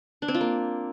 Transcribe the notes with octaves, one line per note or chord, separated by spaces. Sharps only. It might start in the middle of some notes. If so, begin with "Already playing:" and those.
D4
C4
F4
A#3